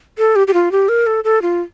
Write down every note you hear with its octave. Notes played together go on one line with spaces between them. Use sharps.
A4
G4
G4
F4
G4
A#4
A4
A4
F4